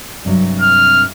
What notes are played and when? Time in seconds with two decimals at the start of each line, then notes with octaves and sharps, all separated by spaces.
0.25 G2 C3 F#3
0.61 F6